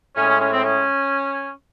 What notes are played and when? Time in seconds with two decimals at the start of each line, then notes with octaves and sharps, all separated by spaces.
0.16 A2 G#3 C#4
0.28 C#4
0.40 C#4
0.52 C4
0.64 C#4